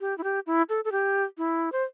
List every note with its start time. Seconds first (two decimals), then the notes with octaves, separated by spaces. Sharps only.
0.01 G4
0.18 E4
0.24 G4
0.47 E4
0.69 A4
0.85 A4
0.92 G4
1.38 E4
1.72 C5